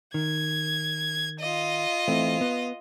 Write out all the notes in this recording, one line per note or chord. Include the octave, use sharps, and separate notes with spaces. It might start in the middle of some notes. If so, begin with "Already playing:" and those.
D#3 G#6
F4 D#5
E3 A3 C4
B3